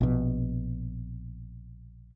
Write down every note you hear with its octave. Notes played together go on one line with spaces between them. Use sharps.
A#1 B2